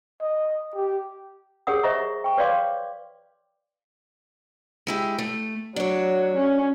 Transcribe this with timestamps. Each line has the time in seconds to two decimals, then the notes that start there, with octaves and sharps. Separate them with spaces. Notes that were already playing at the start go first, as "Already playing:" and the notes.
0.21 D#5
0.75 G4
1.67 G4 G#4 A#4 C#5 F#5 D#6
1.83 C5 D#5 E5 A#5 C#6
2.24 G5 C#6
2.37 B4 C#5 D5 F5 C6 D6
4.87 G#3 E4 G4
5.19 A3
5.76 F#3 D4 C#5
6.36 C#4